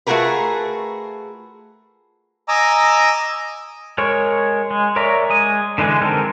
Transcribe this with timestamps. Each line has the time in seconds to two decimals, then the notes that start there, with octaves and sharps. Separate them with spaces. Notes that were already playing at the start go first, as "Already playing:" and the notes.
0.07 A3 F4 F#4 G#4 A#4 B4
2.48 D#5 G#5 A#5 D6 E6
3.98 G#3 A#4 C#5 C#6
4.71 G#3
4.96 A#4 C#5 D5 E5 A#5
5.30 G#3 D#6
5.78 D3 E3 G#3
6.02 D#3 G#3 C4 A4 A#4